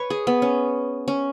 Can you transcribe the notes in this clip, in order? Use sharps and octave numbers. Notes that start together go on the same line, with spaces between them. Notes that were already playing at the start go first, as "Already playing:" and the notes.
Already playing: B4 C#5
G#4
B3
C#4
C#4